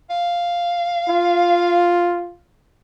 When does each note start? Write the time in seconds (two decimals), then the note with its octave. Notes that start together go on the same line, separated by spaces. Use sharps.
0.10 F5
1.10 F4